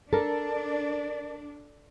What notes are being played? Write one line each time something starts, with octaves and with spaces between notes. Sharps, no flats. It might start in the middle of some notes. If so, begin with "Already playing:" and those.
D4 A4 A#4 D5 A5